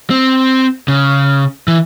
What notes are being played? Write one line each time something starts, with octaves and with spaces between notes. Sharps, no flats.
C4
C#3
E3